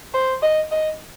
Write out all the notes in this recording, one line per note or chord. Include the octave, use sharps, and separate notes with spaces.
C5
D#5
D#5